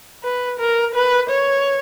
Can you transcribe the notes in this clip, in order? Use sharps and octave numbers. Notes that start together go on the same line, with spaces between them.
B4
A#4
B4
C#5